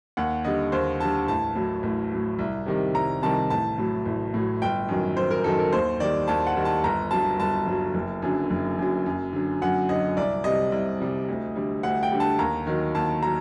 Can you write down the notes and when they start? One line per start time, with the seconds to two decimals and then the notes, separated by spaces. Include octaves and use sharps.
0.17 D#2 F#5
0.44 D3 G3 D#5
0.72 D#2 C5
1.00 D3 G3 A5
1.28 A1 A5
1.55 A2 F#3
1.83 A1
2.12 A2 F#3
2.39 C2
2.66 C3 D#3 G3
2.94 C2 A#5
3.22 C3 D#3 G3 A5
3.50 A1 A5
3.78 A2 F#3
4.05 A1
4.34 A2 F#3
4.62 G1 G5
4.89 F#2 D#3 F#3
5.16 G1 C5
5.31 A#4
5.44 F#2 D#3 F#3 A4
5.59 A#4
5.72 D#2 C5
6.00 D#3 G3 D5
6.28 D#2 A5
6.47 F#5
6.56 D#3 G3
6.65 A5
6.84 G1 A#5
7.11 G2 F#3 A5
7.40 G1 A5
7.66 G2 F#3
7.94 F#1
8.22 F#2 D3 F#3
8.50 F#1
8.78 F#2 D3 F#3
9.06 F#2
9.33 D3 F#3
9.62 F#2 F#5
9.89 D3 F#3 D#5
10.17 C2 D5
10.44 C3 G3 D#5
10.72 C2
11.00 C3 G3
11.28 D2
11.56 D3 G3
11.83 D2 F#5
12.03 G5
12.12 D3 G3
12.20 A5
12.39 D#2 A#5
12.67 D#3 F#3
12.95 D#2 A5
13.23 F#3 A#5